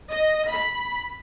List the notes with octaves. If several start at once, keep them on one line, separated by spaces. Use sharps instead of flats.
D#5
B5